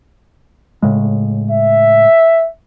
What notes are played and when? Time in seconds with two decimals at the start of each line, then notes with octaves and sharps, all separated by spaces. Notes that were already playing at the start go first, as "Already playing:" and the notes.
0.82 A2 C#3 G#3
1.51 E5